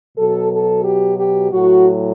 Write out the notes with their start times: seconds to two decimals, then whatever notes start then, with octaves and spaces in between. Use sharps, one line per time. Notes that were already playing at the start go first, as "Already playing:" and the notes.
0.18 B2 F#3 A4
0.52 A4
0.85 G4
1.18 G4
1.51 A2 F#3 F#4